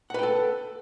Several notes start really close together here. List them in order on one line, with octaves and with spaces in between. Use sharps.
F#5 B4 G5 A4